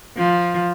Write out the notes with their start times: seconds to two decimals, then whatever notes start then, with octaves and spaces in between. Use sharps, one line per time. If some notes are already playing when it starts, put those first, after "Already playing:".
0.18 F3